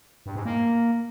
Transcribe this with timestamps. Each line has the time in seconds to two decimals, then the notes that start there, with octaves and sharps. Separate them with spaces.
0.26 G2
0.36 G#2
0.45 A#3